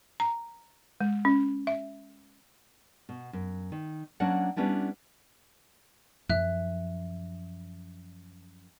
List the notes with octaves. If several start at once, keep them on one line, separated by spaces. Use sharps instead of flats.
A#5
G#3
C#4
E5
B2
F#2
D#3
F#3 A#3 C#4 D4 F#5
G3 B3 C#4 D4 E4
F#2 F3 E5 F#6